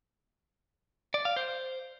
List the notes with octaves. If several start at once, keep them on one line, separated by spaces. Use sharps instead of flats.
D5
F5
C5